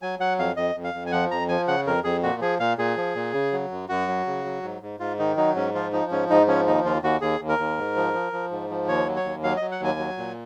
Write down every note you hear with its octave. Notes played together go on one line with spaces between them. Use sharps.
F#3 G#5
F#3 F#5
F2 F5
F2 D#5
F2
F5
F2
G#5
F3 F#5
F2 A#5
F3 G#5
C#3 F#5
F2 A#4
F2 G#4
A#2 F#4
F3 G#4
A#2 F5
A#2 G#4
F3
A#2
C#3
F#3
F#2
F#2 F#4
F#3
C#3
F#3
G#2
G#2
G#2 F4
D#3 D#4
F#3 D#4
G#2 C#4
F3 F4
F3 D#4
G#2 C#4
G#2 D#4
F3 C#4
D#2 D#4
D#2 F4
D#2 F#4
D#2 G#4
D#2
A#4
D#2
G#2
F3
F3
F3
G#2
F3
D#2 C#5
F#3
C#5
D#2
F#3 F5
F#3 D#5
F#5
D#2 G#5
F#3
A#2